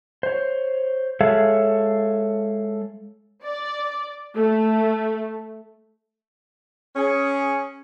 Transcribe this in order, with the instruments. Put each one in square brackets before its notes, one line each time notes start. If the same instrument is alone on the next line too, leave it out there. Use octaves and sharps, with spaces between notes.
[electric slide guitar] C5 C#5
G#3 G#4 A4 C#5 E5 F5
[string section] D5
A3
[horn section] C#4 G#4